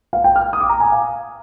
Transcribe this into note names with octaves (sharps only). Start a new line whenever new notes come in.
F5
G5
F6
D#6
D6
A#5
G#5
F5